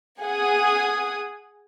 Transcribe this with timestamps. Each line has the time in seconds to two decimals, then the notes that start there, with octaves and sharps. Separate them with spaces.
0.20 G#4 F#5 G#5 D#6